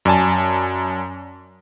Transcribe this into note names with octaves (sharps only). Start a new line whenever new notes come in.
F#2 D5 G#5 A5